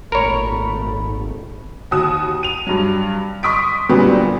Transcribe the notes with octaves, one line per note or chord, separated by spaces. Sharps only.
G#1 A#2 A3 A#4 C#5 B5
D#2 F#4 D#6 E7
D#7 F7
G2 F#3
C6 C#6 D#6 B6 D7
A#2 D3 F#3 G3 B3 C4